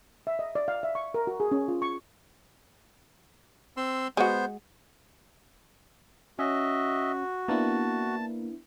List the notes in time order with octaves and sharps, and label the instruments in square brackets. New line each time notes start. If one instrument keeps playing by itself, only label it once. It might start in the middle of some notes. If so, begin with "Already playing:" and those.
[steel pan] E5
D#5
D5
F5
E5
C#6
A#4
F#4
G#4
C#4
F4
C#6
[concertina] C4 C6 E6
[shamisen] G#3 F#4 [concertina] B3 C5
[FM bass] C#4 [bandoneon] F#4 [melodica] D#5 E5
[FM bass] A#3 [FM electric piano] B3 D4 E4 [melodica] A5